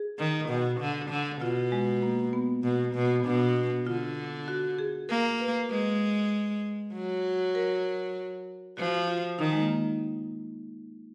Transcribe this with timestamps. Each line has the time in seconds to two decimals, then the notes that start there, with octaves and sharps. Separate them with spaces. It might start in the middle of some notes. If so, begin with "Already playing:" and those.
Already playing: G#4
0.19 D#3
0.49 B2
0.80 D3
1.10 D3
1.41 B2 F4
1.72 G#3
2.02 A#3
2.33 B3
2.63 B2
2.95 B2
3.20 B3
3.25 B2 D4
3.86 D3 F4
4.48 F#4
4.79 G#4
5.09 A#3 A#4
5.40 B4
5.71 G#3 B4
6.93 F#3
7.55 A#4
8.77 F3 F#4
9.08 F4
9.39 D#3 D#4
9.53 G#3
9.59 A#3